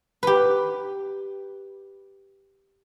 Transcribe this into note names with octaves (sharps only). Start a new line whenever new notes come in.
G4 B4